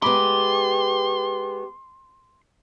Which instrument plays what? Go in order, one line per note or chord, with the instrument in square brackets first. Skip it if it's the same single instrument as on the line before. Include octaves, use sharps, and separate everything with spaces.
[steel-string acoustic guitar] G#3 B3 [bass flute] G4 [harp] B5 D6 [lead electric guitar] C6